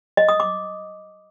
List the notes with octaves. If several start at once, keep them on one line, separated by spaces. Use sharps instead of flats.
D#5
D#6
D6